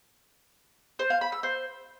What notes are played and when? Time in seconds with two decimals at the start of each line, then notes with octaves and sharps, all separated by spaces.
0.99 C5
1.10 F5
1.21 B5
1.32 E6
1.43 C5